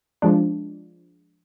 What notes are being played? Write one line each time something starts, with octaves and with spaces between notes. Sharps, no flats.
F3 G#3 D4